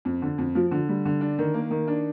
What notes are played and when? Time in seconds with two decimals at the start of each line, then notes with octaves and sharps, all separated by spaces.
0.05 F2
0.22 D3
0.38 F2
0.55 F3
0.71 D3
0.89 G3
1.05 D3
1.21 D4
1.39 D#3
1.54 A#3
1.71 D#3
1.88 D4